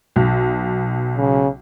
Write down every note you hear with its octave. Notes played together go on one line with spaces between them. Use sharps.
B1
C#3